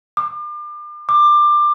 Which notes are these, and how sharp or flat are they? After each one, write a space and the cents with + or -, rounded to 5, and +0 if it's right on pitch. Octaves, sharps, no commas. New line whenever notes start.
D6 +35
D6 +20